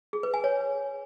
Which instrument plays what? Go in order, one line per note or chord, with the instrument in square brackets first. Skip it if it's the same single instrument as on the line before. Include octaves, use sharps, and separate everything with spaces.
[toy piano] G#4
B4
G#5
C#5